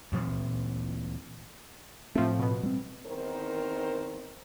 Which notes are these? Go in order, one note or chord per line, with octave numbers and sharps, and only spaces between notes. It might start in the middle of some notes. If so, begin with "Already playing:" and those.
D2 A#2 E3 C4
A2 F3 A3 C4
B2 B3
G3 C4
E2 D#3 C4 D#4 A#4 C5